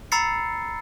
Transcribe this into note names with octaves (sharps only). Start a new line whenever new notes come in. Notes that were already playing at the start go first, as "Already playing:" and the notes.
A#5 B5 E6 A6 C7 C#7